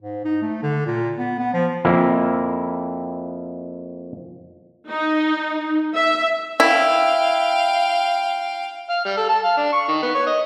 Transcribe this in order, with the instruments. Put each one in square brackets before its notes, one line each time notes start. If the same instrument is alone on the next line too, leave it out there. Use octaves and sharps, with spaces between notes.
[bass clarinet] G#2
D#4
A3
D3
A#2
B3
B3
F3
[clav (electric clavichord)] F2 A#3 E4
[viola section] D#4
E5
[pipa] E4 [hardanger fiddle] F5 G5
[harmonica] F5
G3
A4
A5
F5
D4
C#6
D#3
B3
C#5
D#5